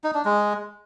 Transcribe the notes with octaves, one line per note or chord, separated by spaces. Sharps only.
D#4
D4
G#3